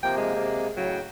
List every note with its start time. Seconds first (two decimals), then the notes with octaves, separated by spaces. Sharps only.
0.03 C3 F3 A#3 G5
0.17 G#3
0.35 C3 A#3
0.77 A2 C#3 F#3 G5